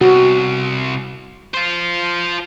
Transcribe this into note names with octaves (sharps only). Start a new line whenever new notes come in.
C2 F#4
F4 C5